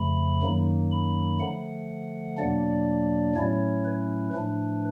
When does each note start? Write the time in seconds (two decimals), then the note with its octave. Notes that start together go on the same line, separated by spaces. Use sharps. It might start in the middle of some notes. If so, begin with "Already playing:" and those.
Already playing: F2 C#3 F3 A3 B5
0.42 F#2 D#3 F#3 A#3 D#4
0.91 B5
1.40 D3 F3 A3 F#5
2.37 E2 B2 F#3 A#3 D4 D5
3.35 A2 F#3 A3 C#4 E4 C#5
3.85 B4
4.33 A2 F3 A3 D4 B4